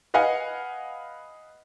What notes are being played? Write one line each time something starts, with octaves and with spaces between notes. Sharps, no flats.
B4 D#5 F5 F#5 G#5